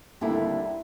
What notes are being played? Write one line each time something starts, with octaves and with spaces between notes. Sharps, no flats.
D#2 D3 G3 C4 E4